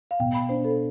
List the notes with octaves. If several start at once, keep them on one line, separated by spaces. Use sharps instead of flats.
F5
B2 G5
B5
D4 C5
A4